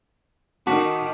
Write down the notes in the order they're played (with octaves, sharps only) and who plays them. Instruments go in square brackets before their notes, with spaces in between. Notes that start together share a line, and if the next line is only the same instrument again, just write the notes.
[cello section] D#3 [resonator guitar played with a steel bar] F#4 [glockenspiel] A5 D6 B6